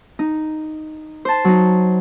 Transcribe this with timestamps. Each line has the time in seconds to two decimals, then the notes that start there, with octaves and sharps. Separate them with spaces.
0.19 D#4
1.25 C5 A5
1.45 F#3 D#4